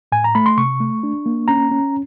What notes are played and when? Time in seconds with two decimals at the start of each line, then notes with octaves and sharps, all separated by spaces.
0.12 A2 G#5
0.24 A#5
0.35 A3 B5
0.46 C6
0.57 C3 C#6
0.80 A3
1.03 D4
1.26 A#3
1.48 C#4 A#5
1.71 C#4